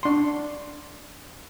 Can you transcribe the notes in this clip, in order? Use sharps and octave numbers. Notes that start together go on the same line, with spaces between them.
D4 C6